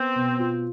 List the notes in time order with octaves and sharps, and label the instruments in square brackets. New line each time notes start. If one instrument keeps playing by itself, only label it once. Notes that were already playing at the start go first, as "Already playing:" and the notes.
Already playing: [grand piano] B3 [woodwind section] C4
[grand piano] B2
F4